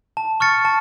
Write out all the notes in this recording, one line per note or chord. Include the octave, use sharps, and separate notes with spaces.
A5
C#6 F6 A6 C#7
A5